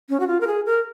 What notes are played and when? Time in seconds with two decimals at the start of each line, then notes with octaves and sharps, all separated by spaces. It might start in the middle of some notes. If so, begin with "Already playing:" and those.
0.09 C#4
0.20 F#4
0.27 F4
0.41 A#4
0.47 G#4
0.66 A#4